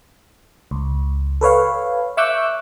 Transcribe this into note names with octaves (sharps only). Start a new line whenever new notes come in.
C#2
A4 B4 C#5 F5
E5 C#6 D6 E6 F#6 G6